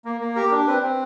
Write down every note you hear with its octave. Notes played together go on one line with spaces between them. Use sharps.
A#3
A#3
G4 A#4
D4
C4 B4
C4